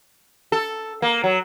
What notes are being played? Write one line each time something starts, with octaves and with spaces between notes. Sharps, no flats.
A4
A#3
F#3